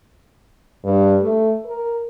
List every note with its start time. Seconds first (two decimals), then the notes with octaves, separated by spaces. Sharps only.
0.85 G2
1.22 A3
1.65 A#4